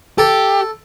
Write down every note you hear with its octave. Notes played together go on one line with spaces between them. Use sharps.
G4 A4